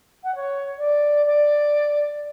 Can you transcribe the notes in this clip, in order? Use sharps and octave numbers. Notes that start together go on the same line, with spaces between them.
F#5
C#5
D5
D5